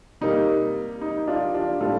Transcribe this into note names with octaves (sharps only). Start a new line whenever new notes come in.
C3 G3 A#3 D#4
D#4
D4 F4
D4 F4
A2 G3 C4 F4 A4